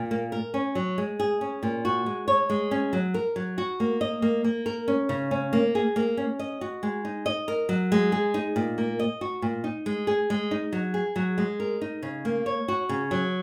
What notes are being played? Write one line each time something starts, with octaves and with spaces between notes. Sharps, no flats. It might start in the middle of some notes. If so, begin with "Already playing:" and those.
Already playing: A#2
A#3
A#4
C#4
F#3
G#3
G#4
C#4
A#2
F#4
G#3
C#5
G#3
C#4
F#3
A#4
F#3
F#4
A#3
D#5
A#3
A#3
A#4
C#4
C#3
C#4
A#3
G#4
A#3
C#4
D#5
F#4
G#3
D#4
D#5
A#4
F#3
G#3
G#4
D#4
A#2
A#3
D#5
F#4
A#2
D#4
G#3
G#4
G#3
D#4
F#3
G#4
F#3
G#3
A#4
D#4
C#3
A#3
C#5
F#4
C#3
F#3